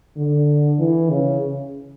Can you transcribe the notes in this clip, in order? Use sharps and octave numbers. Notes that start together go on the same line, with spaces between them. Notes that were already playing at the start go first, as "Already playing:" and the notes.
D3
E3
C#3